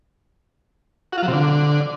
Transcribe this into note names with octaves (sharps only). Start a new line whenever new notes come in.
F#4
F4
F#3
C3
D3